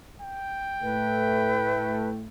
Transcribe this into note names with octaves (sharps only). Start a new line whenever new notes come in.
G5
A2 A3 B4